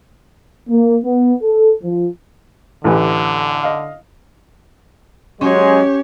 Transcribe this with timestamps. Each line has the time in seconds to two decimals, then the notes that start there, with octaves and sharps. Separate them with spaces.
0.69 A#3
1.04 B3
1.42 A4
1.83 F3
2.84 A1 D3 E3 G4
3.63 D#5 F5
5.41 F#3 G#3 C#4 G4 C#5